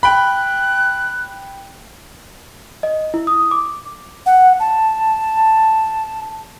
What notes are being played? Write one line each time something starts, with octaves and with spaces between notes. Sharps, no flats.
G5 B5 F#6
D#5
E4
D#6
D6
F#5
A5